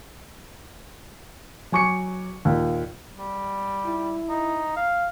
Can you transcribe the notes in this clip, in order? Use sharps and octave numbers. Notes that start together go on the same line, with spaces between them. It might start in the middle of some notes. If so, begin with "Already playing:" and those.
F#3 G#5 C#6 D6 C#7
D#2 A#2
G3
E4
D#4
F5